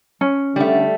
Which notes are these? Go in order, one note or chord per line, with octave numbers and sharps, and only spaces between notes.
C#4
D3 G3 A3